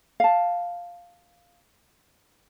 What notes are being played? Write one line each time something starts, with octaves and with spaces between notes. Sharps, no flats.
F5 A5